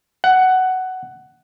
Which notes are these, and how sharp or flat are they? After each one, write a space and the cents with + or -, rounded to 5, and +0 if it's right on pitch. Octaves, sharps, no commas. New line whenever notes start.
F#5 +10